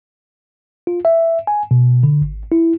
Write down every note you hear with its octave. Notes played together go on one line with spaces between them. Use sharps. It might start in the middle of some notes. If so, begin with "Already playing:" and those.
F4
E5
G#5
B2
D3
G#1
E4